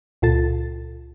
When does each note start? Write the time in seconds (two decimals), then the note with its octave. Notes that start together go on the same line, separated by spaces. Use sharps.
0.22 C#2 A#2 F4 A4 A6